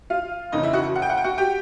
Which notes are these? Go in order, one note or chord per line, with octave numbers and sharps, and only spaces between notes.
F4 F5
F#1 F2 C#3 E3 D#4 D#5
E4 E5
F#4 F#5
F#5
G5
F#5
G5
F#4 F#5
G4 G5